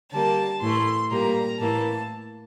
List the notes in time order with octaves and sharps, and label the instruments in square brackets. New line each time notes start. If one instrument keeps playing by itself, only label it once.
[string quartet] D3 G3 A#3 A5
A2 E3 A3 C6
A#2 G3 A#3 A#5
A2 E3 A#3 A5